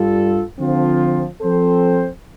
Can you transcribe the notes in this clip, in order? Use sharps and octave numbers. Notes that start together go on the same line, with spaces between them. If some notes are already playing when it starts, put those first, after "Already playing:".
Already playing: G2 G3 F4 A4
D3 F3 C4 F4
F3 C4 A4 C5